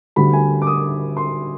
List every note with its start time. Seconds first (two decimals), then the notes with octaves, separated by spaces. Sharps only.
0.16 D2 D3 G3 B5
0.33 G#5
0.62 D6
0.67 D#6
1.17 C6